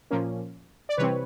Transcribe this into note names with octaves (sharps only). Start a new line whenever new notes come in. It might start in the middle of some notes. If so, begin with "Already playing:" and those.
A#2 F3 A#3 C#4
D5
C3 E3 G3 C4 B4 C#5